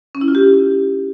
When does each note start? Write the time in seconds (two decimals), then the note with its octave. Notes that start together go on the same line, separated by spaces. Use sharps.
0.15 C#4
0.21 E4
0.28 F4
0.35 G4